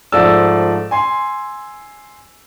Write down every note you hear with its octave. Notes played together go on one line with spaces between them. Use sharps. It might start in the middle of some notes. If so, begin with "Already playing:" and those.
G#2 F3 A3 D5 E6
G#5 C6